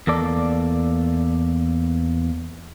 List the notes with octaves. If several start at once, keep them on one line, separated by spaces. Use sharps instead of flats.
E2 A#3 A4 D5